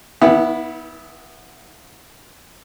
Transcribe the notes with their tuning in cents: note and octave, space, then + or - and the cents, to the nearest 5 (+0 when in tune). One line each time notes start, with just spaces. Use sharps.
D#3 +40 B3 -15 E4 +0